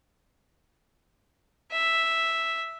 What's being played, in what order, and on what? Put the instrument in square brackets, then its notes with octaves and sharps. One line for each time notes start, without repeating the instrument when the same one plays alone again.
[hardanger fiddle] E5